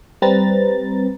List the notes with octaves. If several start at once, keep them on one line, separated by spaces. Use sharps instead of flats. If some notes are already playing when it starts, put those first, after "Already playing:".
G3 C4 B4 A#5 A6